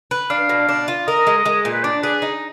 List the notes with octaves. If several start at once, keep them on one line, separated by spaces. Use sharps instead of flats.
B4
D4 F5
B2
D4
F4
A#4 D#5
G#3
G#3
A#2
B4
D4 D5
G#4 B4
D#4